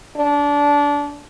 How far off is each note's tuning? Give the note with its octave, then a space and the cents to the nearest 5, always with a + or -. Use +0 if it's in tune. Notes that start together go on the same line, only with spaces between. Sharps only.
D4 -25